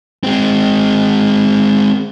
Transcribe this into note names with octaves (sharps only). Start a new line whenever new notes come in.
G#3 C4